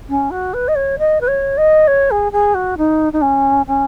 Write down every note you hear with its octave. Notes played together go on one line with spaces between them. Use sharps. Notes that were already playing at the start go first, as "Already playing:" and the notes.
C#4
F#4
B4
D#5
C#5
D#5
B4
C#5
D#5
C#5
G#4
G#4
F#4
D#4
D#4
C#4
C#4